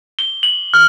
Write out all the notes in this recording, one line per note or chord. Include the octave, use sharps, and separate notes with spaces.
G7
F#7
F6